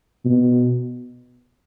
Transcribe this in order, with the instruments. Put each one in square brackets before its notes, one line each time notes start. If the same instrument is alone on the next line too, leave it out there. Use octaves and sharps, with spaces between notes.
[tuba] B2